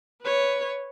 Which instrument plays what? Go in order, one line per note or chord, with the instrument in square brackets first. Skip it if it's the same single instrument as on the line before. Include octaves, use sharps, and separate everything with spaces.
[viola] B4 C#5